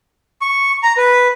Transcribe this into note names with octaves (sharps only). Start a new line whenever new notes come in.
C#6
A#5
B4